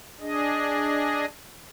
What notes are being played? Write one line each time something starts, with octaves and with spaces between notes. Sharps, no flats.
D4 G#4 D#5